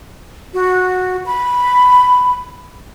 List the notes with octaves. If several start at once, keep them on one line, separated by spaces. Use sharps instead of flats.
F#4
B5